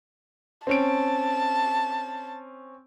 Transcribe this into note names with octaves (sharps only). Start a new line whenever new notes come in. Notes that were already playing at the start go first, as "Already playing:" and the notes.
C4 C#4 A5 D7